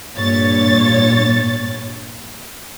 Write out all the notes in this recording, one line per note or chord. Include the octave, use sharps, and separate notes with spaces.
G2 A#2 C#5 A6